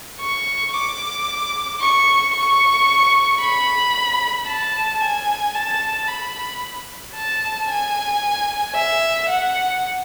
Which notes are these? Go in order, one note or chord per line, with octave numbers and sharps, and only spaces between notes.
C#6
D6
C#6
C#6
B5
A5
G#5
A5
B5
A5
G#5
E5
F#5